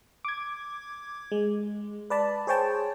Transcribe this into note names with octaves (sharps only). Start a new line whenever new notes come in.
D6 G#6
G#3
B4 D5 A5 B5
G#4 C5 C#5 G5 A5